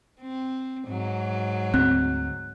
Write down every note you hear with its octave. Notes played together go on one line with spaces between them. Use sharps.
C4
G#2 F#3
D2 C4 F#6